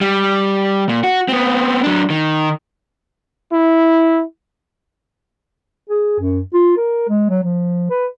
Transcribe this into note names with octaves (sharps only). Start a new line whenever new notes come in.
G3
A#2
F#4
B3 C4
F#3 D4
D#3
E4
G#4
F#2
F4
A#4
G#3
F#3
F3
B4